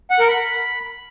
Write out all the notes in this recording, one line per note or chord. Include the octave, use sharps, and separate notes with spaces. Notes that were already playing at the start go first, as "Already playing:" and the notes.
F#5
A#4
B5